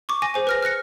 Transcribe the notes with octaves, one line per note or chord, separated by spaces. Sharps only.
C#6 D6
G#5 D6 A#6
G#4 C5 G#5
B4 F6 A#6
F6 F#6 A#6 C#7